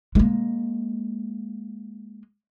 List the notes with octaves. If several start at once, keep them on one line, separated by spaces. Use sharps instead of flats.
G#3 A#3